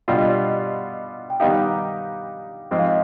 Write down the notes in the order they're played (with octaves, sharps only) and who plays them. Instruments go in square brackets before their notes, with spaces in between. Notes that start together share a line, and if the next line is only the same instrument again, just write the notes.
[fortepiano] B2 G3 D4 F4 [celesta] F5
[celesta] D#5
D5
D#5
G5
[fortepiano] D#3 G3 B3 D#4 G4 [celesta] F5
[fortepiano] G#2 F3 C4 [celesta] D#5
[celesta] F5
D#5